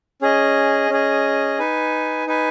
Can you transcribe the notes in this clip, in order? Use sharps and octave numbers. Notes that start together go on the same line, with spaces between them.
C#4 G#4 D#5
C#4 G#4 D#5
D#4 B4 G#5
D#4 B4 G#5